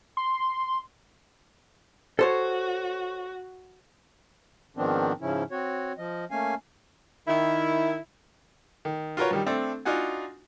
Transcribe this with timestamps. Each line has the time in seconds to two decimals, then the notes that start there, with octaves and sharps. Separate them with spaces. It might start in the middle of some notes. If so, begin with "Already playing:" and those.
0.17 C6
2.19 F#4 A4 C5 C#5
4.77 G#2 D#3 F3 B3 C4 D4
5.21 G#2 C#3 F3 C#4 E4
5.51 C4 F#4 C#5
5.98 F3 D#5
6.31 A3 A#3 C#4 F5 G#5
7.28 D#3 E4
8.85 D#3
9.17 F4 F#4 A#4 B4 C#5
9.31 G2 D#3 G3
9.46 A3 C4 D4 A4
9.85 D4 D#4 F4 F#4 F#5 G#5